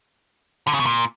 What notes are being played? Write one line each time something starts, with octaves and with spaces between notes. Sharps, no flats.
D3
C#3
B2
A#2